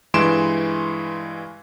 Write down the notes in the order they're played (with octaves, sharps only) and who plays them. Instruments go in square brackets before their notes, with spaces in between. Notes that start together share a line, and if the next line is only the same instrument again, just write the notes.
[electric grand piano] G2 E3 G#3 C6 D7 E7